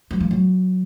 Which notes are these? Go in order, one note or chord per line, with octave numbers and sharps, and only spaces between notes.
F#3
F3
F#3